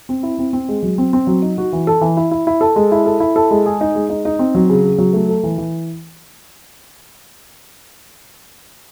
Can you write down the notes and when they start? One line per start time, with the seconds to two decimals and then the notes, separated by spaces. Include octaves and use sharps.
0.09 C4
0.23 E4
0.39 C4
0.53 C4
0.69 G#3
0.83 F#3
0.98 C4
1.13 C4
1.27 F#3
1.42 D#4
1.58 F#4
1.73 E3
1.87 A4
2.01 E3
2.17 E4
2.31 E4
2.47 E4
2.61 A4
2.76 G#3
2.92 E4
3.06 A4
3.20 E4
3.36 A4
3.51 G#3
3.66 G#4
3.81 D#4
3.95 G#3
4.10 D#4
4.25 D#4
4.39 C4
4.55 F#3
4.69 C#3
4.85 C#3
4.98 F#3
5.13 A3
5.29 A4
5.43 E3
5.58 E3